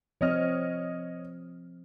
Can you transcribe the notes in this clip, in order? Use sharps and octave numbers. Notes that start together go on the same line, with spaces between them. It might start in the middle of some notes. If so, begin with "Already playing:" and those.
F3 C4 C#5 D#5 F6